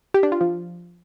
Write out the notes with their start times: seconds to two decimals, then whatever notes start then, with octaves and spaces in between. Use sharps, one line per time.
0.14 G4
0.23 D4
0.32 F4
0.41 F3